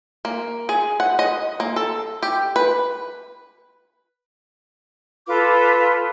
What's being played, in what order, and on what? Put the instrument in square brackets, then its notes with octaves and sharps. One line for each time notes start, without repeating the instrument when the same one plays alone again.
[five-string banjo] A#3
G#4
F#5
D#5
A#3
A4
G4
B4
[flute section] F4 A4 B4 D6